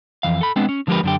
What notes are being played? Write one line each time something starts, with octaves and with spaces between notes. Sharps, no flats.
F2 E3 F5
A4 B5
G#3 B3 C4 D4
C#4
D3 F3 G#3 G4 A#4 B4
F#2 D3 G4